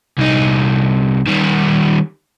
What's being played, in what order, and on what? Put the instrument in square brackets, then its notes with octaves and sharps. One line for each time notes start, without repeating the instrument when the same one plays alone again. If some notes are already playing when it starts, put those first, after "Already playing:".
[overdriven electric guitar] C2 D#4
D#3 G3